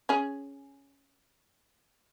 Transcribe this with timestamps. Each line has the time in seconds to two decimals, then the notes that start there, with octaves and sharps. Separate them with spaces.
0.09 C#4 G#4